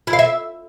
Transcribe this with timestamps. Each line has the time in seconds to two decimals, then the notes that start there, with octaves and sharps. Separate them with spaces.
0.07 E4
0.13 F5
0.19 E5